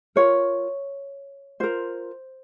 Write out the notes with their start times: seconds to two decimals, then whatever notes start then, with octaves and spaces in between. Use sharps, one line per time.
0.16 F4 A#4 C#5
1.60 F4 A#4 C5